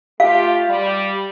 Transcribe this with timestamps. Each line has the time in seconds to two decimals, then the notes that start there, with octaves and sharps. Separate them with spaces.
0.20 A3 F4 G4 F5
0.69 G3